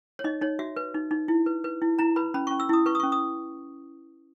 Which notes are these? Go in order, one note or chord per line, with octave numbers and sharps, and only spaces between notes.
C#5
D#4 D#5
D#4 C#5
F#4 E5
B4
D#4
D#4
E4
B4
B4
E4
E4 A#5
B4 B5
C#4 B5
C#4 C#6
E6
E4 D#6
B4 C#6
D#6
C#4 C#6
D#6